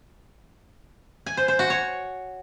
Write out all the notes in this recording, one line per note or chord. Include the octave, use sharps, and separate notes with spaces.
G#5
C5
C5
F#4
C#5